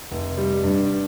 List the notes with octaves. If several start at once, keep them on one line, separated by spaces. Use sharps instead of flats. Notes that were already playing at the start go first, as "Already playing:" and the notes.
F1
G3
G2